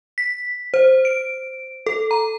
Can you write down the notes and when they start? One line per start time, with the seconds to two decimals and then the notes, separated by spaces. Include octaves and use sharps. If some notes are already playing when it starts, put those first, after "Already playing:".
0.18 B6
0.74 C5
1.05 D7
1.86 A4
2.11 A#5